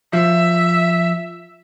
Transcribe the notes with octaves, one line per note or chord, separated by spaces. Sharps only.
F3 E5